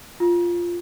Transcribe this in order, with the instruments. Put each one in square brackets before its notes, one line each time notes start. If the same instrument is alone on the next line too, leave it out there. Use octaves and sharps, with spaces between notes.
[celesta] F4